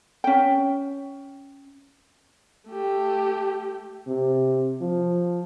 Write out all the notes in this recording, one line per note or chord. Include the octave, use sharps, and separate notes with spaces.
C#4 G5
A3 G4
C3
F3